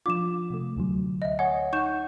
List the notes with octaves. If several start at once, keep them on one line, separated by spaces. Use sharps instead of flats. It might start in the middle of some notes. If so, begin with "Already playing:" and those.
F3 D4 F4 D6 E7
C3 A3
D2 D3 F#3
D#5 E5
C#5 D#5 F#5 G#5
D#4 F#5 C#6 G6 E7